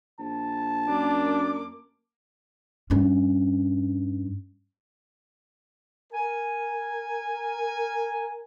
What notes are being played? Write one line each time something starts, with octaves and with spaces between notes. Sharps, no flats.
A#1 A5
F#2 A#3 D4 D6
G2 C#4
A#4 G#5